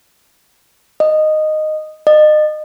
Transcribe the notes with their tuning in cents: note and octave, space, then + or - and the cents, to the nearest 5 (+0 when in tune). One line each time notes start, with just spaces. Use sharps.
D#5 -10
D#5 -30